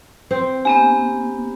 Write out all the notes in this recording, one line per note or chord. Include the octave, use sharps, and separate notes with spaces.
C4
A#3 B3 D4 G4 G#5